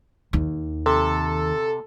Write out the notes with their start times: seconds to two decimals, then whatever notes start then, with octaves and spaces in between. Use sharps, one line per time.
0.33 D#2
0.86 C3 A4